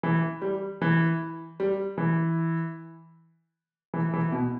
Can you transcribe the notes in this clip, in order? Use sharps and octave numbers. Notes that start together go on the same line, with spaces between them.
E3
G3
E3
G3
E3
E3
E3
B2